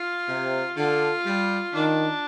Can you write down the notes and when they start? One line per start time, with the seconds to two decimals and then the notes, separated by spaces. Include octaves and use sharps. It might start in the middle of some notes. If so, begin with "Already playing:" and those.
Already playing: F4
0.28 C3
0.77 D3 F4
1.25 G3
1.73 D#3 D4